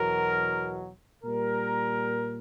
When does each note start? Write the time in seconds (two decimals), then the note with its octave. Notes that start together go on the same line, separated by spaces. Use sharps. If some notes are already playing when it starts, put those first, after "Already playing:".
Already playing: E2 B2 F#3 A#4
1.24 A#2 G3 A#4